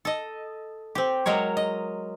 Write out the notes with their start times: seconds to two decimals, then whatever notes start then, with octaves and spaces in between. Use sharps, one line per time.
0.05 A4 D#5
0.95 C4 G4
1.26 F#3 G#3 A#4 C#5
1.57 D#5